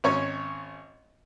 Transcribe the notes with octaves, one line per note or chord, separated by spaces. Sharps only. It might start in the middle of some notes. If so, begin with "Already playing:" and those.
G#1 C#4 C#5